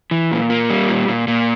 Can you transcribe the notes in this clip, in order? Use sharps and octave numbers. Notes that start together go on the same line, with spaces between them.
E3
A#2
A#3
G3
A#2
A#2
A#2